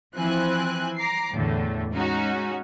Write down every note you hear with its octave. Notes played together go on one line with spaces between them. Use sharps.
E3 F3 C4 E4 G#5 F#6
A#5 D6 C7
E2 A2 D3 A3
G#3 C#4 D#4 F#4